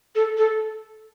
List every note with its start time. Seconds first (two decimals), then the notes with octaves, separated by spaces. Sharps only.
0.15 A4
0.38 A4